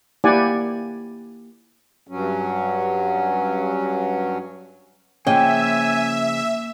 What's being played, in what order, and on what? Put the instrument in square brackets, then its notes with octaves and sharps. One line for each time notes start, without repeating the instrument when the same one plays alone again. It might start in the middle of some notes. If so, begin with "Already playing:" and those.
[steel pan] A#3 E4 G4 D5 F#5 G#5
[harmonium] G2 F#3 C#4
[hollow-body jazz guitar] C#3 F3 [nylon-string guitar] A#3 D#5 G5 [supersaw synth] E5 [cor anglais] G#5